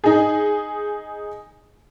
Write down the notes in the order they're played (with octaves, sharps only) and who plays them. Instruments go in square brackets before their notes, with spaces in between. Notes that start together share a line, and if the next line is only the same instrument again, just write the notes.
[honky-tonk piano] D#4 G#4